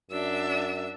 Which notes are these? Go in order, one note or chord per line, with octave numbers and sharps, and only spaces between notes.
F#2 D4 E5 E6